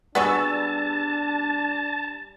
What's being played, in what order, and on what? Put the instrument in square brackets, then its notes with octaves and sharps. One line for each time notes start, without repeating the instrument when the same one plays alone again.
[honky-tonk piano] G3 E6 [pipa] B3 F#4 G#4 [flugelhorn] D4 [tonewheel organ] A5